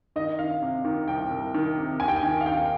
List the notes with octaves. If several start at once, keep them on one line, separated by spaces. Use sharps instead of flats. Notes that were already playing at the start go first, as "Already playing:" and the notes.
D#3 D#5
D#3 F5
C3
D#3
C2 G5
C2
D#3
C3
D#2 G#5
G5
G#5
D#3
F5
D#2 G5